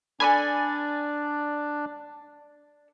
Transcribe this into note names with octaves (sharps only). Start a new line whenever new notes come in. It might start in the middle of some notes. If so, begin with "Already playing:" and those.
D4 A4 D5 G#5 B5